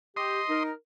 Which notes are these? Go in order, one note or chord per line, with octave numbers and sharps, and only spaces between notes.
G4 D#5 C6
D#4 A#4